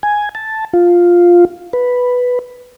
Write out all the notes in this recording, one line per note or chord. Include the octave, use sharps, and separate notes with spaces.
G#5
A5
F4
B4